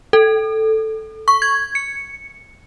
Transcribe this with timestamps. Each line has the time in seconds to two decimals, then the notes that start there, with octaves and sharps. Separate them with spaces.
0.13 A4
1.28 C#6
1.42 G#6
1.75 C#7